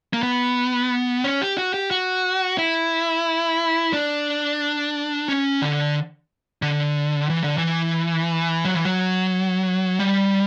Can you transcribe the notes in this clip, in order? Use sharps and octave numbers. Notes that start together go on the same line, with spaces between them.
A#3
B3
C#4
G4
F#4
G4
F#4
E4
D4
C#4
D3
D3
E3
D3
E3
F#3
E3
F#3
G3